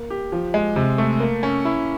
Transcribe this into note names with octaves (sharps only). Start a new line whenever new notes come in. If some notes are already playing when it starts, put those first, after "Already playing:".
Already playing: A#3
G4
F3
G#3
C3
A3
A#3
C#4
E4